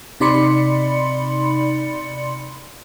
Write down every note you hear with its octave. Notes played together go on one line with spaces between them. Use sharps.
C3 D#4 D5 B5 C6 C#7